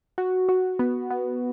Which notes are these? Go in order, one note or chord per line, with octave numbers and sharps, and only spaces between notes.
F#4
F#4
B3
B3